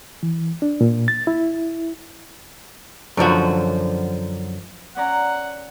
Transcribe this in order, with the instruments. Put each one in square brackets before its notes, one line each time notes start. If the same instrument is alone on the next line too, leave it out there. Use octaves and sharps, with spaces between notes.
[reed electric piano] E3
D4
A#2
A6
E4
[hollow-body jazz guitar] F#2 D3 F3 F#4
[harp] C#4 D5 A#5 [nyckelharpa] F#5